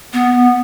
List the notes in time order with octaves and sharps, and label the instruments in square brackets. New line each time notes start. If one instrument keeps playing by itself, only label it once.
[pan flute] B3